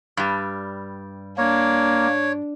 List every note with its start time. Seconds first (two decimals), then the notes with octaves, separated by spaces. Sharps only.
0.17 G2 G3
1.38 A#3 D4 C#5